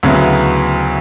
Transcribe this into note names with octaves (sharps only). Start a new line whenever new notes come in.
D2 C#3 F#3 B3 E4